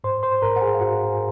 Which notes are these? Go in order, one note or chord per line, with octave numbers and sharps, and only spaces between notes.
G#2 C5 C6
C5 C6
G#2 A#4 A#5
F#5
G#4 G#5
F5
G#2 F#4 F#5